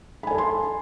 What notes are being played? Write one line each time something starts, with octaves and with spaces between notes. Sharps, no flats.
A4 G#5 A5 B5 C6